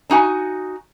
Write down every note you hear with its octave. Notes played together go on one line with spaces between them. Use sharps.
D4 D#4 F#4 G#5